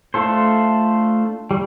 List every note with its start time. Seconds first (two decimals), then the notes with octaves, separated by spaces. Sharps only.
0.14 A3 D4 F4 A4 C5
1.51 G3